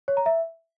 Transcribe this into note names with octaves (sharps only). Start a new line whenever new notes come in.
C#5
A#5
E5